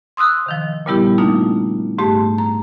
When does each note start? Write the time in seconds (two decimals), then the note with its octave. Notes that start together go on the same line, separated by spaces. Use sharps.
0.17 C6 D#6 E6 F#6
0.46 C3 D#3 F3
0.86 A#2 C#3 G3 B3 E4 G4
1.18 A3 A#3 D4 D#4 F4
1.98 G#2 A3 G4 A5 C6
2.38 A#5